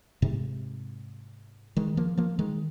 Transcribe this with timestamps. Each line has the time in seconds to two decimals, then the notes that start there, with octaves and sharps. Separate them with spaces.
0.22 G#2 C3
1.77 D#3 G#3
1.97 F3 A#3
2.17 F3 A#3
2.39 D#3 G#3